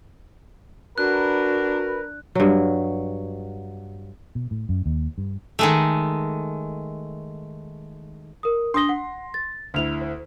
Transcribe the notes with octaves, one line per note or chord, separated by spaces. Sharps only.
D4 F#4 A#4 B4 F#6
G2 F#3
B2
A2
F#2
D#2
G2
D#3 G#3 A3
A#4 D#6
D4 C6 D#6 A#6 G7
F#5
A6
D2 E4 F6 F7
C5